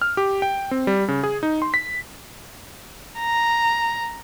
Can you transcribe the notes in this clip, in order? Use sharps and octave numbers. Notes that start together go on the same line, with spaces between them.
F6
G4
G5
C4
G3
C#3
G#4
D#4
C6
B6
A#5